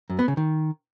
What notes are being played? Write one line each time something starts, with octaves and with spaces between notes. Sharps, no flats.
F#2
B3
C#3
D#3